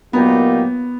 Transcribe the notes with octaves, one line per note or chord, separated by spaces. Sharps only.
A#2 F#3 A#3 B3 D#4 G4